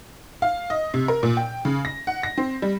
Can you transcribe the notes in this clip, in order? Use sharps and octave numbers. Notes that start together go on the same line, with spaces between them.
F5
D#5
C3
A#4
A#2
G5
C#3
A#6
F#5
A#6
C4
G3